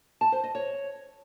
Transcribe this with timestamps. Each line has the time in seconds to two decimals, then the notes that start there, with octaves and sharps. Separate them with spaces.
0.21 A5
0.32 C5
0.43 D#5
0.55 C#5